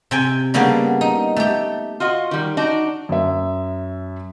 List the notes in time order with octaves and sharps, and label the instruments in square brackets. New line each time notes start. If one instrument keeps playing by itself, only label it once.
[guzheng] C3 G5 G#5
C#3 G3 A#3 B3 D4
D#4
A3 G4
[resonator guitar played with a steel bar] F4 F#4 D#5
D#3 G3
D4 D#4 F#4
[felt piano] F#2 E5